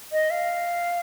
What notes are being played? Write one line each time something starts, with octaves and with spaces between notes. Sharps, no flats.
D#5
F5